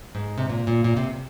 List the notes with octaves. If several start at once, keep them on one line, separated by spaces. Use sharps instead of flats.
G#2
C3
A#2
A#2
A#2
C3